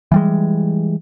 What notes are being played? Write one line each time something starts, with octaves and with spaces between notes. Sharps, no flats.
E3 G3 G#3